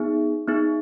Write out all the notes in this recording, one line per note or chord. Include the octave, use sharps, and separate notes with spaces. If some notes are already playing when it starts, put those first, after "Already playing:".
Already playing: B3 D#4 G#4
B3 D#4 G#4